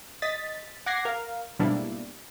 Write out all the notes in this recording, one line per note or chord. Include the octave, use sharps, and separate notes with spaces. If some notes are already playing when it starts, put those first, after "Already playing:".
D#5 A6 B6
F#5 D6 G#6 A#6 C7
A#4 F5
G#2 B2 G3 A#3 D4 E4